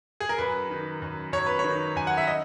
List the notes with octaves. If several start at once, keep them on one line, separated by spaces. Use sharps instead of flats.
G#4
A#4
F#2 B4
D#3
F#2
F#2 C#5
B4
C#5
D#3
F#2 G#5
F#5
E5
D#5